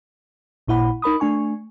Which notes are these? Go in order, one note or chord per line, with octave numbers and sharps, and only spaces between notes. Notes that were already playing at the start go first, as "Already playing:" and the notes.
A1 A#2 E4 F#5 B5
D#4 A#4 B5 D#6
A3 D4 G#5 C#6